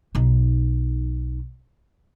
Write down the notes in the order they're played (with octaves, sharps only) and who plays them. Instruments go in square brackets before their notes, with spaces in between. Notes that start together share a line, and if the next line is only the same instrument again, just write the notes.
[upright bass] B1 D#4